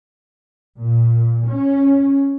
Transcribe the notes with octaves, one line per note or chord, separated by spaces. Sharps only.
A#2
C#4